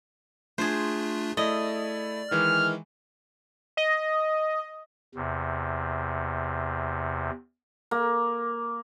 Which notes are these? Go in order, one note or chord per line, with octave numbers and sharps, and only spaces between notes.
A3 D4 F4 G#4 C5
A3 E4 D5 D#5
D#3 E3 G#3 F6
D#5
E2 C3
A#3